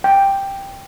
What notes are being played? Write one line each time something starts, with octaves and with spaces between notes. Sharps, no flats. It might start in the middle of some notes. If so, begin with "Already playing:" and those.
G5